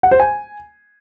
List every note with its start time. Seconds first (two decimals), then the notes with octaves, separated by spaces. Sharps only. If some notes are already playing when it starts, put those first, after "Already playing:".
0.03 F#5
0.11 C5
0.20 G#5